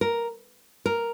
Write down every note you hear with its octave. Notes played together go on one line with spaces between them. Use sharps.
A#4
A#4